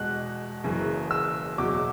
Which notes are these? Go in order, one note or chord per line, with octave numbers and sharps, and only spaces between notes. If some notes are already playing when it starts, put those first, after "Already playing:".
Already playing: E2 B2 G#3 F#6
F#1 F#2 C#3 E3
E6
F#1 E2 B2 F#3 D6